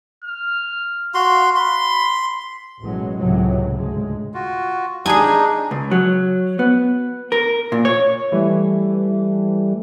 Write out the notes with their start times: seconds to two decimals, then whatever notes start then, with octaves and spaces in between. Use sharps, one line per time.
0.24 F6
1.14 F#4 F5 C6
1.55 B5 C6
2.83 A1 B2 F#3 G#3
3.18 C#2 A2 C3 F#3
3.73 D2 G#2 G#3
4.34 F4 F#4
5.06 D4 D#4 G#4 G#5
5.71 C#2
5.91 F#3
6.59 B3
7.32 A#4
7.72 A#2
7.85 C#5
8.32 E3 G3 A3